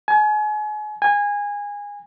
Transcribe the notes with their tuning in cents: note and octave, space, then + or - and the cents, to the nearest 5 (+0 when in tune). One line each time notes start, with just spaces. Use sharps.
G#5 +35
G#5 -20